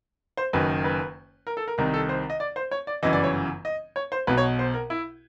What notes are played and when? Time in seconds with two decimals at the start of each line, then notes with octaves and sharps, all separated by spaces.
0.37 C5
0.53 F#1 F#2 D#3 B4
0.84 B4
1.47 A#4
1.57 A4
1.68 A#4
1.78 C2 C3 D#3 A#4
1.94 A4
2.09 C5
2.30 D#5
2.40 D5
2.56 C5
2.71 C#5
2.87 D5
3.03 G1 F#2 C#3 E3 D#5
3.13 D5
3.23 C#5
3.65 D#5
3.96 C#5
4.12 C5
4.27 B1 B2 B4
4.37 C#5
4.59 C5
4.74 A#4
4.90 E4